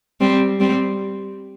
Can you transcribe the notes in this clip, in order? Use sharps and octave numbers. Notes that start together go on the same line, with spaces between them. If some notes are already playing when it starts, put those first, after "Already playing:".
G3 C4
G3 C4